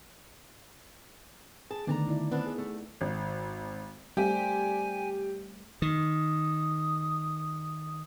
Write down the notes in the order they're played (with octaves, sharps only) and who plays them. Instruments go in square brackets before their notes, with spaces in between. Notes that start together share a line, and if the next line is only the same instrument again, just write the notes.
[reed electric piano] G#4 [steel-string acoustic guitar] A5
[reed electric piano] D3 D#3 A3 [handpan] B3 [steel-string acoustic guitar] D4 A5 A#5
[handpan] D#4 E4 D5
[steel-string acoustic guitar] B3 C4 D4
[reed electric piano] G#4
[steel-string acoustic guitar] A3
[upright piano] G#1
[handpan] G3 A3 C4 [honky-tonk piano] G4 [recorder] G#5
[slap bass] D#3 [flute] D#6